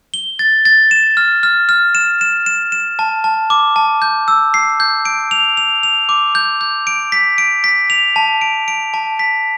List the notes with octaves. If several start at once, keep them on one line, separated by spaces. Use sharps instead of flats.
G7
A6
A6
E7
F6
F6
F6
E7
E7
E7
E7
A5
A5
D6
A5
G6
E6
C7
G6
D7
F7
F7
F7
D6
G6
G6
D7
B6
D7
B6
F7
A5
D7
D7
A5
B6